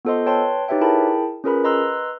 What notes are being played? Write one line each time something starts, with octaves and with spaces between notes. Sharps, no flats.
B3 F4 A4 C5 D#5 C6
B4 C#5 G5 A5 C6
D#4 G4 B4 C#5 E5 G5
E4 G#4 A#4 G5 A5 B5
C#4 F4 G#4 A#4 B4 B5
B4 D#5 A#5 C6 E6 F#6